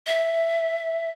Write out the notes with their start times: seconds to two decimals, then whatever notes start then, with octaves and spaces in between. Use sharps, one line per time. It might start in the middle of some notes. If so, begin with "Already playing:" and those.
0.07 E5